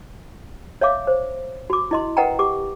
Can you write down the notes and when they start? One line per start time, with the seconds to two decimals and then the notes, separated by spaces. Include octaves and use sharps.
0.81 C#5 E5 F5 D6
1.07 C5
1.70 F#4 D6
1.91 E4 D#5 C6
2.17 A#4 B4 D#5 F#5 G5 A#5
2.39 G4 D6